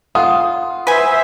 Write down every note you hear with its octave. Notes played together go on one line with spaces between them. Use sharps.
F4 F#5 C6 D#6
B4 C5 E5 G#5